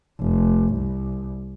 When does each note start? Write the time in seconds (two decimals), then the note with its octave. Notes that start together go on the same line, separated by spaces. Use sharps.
0.20 F1
0.75 C2